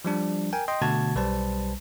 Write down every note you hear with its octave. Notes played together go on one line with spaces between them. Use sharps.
F3 G3 D4
A#4 G5 G#5
D#5 G5 C6
B2 D3 A3 F#4 A5 G#6
B1 G3 B4 C5 A5